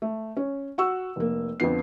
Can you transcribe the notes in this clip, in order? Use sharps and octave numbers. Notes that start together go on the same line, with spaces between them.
A3
C#4
F#4 F#5 C#6 E6
F1 A#3
F2 D3 F3 B3 C7